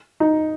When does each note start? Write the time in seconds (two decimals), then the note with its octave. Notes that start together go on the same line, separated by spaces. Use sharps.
0.20 D#4